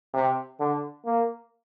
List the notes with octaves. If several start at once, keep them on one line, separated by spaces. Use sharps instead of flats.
C3
D3
A#3